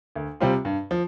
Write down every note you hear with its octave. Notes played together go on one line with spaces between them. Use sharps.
D2
C3 G3 C4 F4
G2
F3